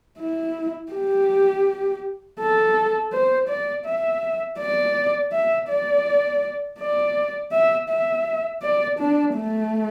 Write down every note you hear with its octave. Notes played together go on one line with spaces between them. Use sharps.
E4
G4
A4
C5
D5
E5
D5
E5
D5
D5
E5
E5
D5
D4
A3